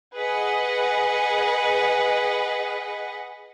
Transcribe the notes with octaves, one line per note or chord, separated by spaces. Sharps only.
G#4 B4 D#5 F#5